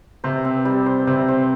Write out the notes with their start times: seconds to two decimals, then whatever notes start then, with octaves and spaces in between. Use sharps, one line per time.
0.24 C3 C5
0.45 C4
0.65 G3
0.86 C5
1.07 C3 C4
1.28 C5